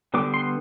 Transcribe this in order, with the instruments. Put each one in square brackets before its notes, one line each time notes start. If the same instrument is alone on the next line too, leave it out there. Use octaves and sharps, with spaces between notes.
[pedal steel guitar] D3 G3 B3 D6
C6